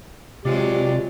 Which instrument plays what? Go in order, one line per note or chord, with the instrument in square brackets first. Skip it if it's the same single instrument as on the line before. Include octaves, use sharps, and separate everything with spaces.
[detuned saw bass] C3 [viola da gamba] F#3 G#3 F4 [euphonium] G4 [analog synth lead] D5